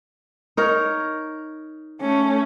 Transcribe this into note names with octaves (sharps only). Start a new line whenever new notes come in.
D#4 A#4 C#5
A3 C#4